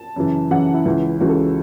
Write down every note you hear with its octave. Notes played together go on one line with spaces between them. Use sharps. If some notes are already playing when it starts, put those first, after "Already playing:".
Already playing: A5
F#2 C#3 E3
F#2 C#3 E3 F#5
E4
C#2 C#3 E3
C#2 C#3 E3 F#4
A4
F#4